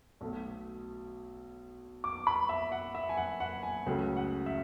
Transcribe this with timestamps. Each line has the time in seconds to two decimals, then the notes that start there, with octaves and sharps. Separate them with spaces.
0.21 B1 B2 A3
2.04 D6
2.27 B5
2.49 E5
2.72 F#5
2.95 E5
3.09 G#5
3.17 F#5
3.40 F#5
3.63 G#5
3.86 C#2 C#3 F#3 A3
4.16 F#5
4.46 E5